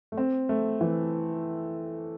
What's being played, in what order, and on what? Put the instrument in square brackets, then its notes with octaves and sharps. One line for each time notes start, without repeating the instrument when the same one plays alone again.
[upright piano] A3
C4
A3
E3